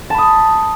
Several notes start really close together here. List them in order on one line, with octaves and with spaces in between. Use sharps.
A5 B5 D#6